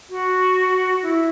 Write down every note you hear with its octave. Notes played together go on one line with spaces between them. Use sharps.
F#4
E4